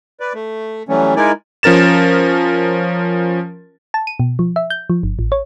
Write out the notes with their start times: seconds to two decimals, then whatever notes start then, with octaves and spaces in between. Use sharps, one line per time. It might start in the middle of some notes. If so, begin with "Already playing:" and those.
0.20 B4 D5
0.35 A3
0.89 E3 F#3 G3 A3 C#4
1.16 G#3 D#4 E4 A#4 D5 G#5
1.63 F3 C#4 A#4 A6 E7
3.94 A5
4.07 D#7
4.20 B2
4.39 F3
4.56 E5
4.70 G6
4.90 F3
5.03 G1
5.19 A1
5.32 C#5